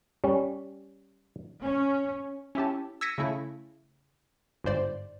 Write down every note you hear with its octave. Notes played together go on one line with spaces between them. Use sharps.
G3 C#4
C#4
C#4 E4 G4 A5
E6 G#6 A#6 B6 C#7 D#7
C#3 A3 E4
G1 G#2 C5 D5